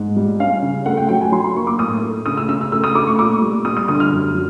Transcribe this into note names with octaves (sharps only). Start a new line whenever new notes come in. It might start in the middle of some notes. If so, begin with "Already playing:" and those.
Already playing: G#2
G3
C#4 F5
C#3
A3 F#5
G5
F#3 G5
G#5
F#3 C6
C6
A#3 C#6
D6
A2 D#6
A3
C#3 D#6
E6
C#3 E6
E6
A3 E6
D#6
A3 D6
C#6
A#2 D6
G3
G3 D#6
D#6
D3 D#6
F6
F#2
F#3